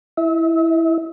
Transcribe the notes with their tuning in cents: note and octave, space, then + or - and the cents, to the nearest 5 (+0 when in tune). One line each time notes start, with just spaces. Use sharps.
E4 +0 E5 -40